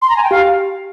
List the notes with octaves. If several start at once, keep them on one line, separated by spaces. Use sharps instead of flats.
C6
A#5
G#5
G5
G4 F5